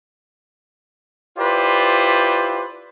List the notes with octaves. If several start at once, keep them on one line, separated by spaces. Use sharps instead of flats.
E4 F4 G4 B4 C5 D5